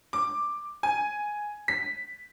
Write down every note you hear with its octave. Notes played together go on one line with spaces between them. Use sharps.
D6
G#5
B6